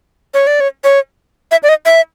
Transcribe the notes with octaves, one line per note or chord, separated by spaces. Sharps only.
C#5
D5
C#5
C#5
E5
D5
D#5
E5